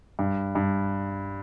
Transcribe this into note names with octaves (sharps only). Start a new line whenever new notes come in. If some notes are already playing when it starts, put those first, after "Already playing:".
G2
G2